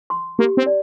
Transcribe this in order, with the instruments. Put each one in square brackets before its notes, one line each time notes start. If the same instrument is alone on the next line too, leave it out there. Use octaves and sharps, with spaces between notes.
[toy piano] C6
[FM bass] A#3 [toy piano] G4
[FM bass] C4
[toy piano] D5